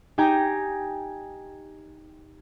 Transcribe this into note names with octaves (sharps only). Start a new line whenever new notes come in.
D#4 G4 G5 G#5 A#5